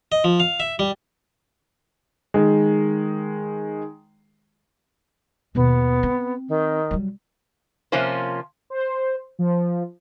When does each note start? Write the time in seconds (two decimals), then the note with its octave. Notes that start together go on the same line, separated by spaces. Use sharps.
0.12 D#5
0.24 F3
0.40 F5
0.60 E5
0.79 G3
2.34 D#3 G#3
5.55 D#2 B2 B3
6.03 C4
6.48 D#3
6.91 F#3 G3
7.92 C3 F3 A#3 C#4 F4 C5
8.70 C5
9.39 F3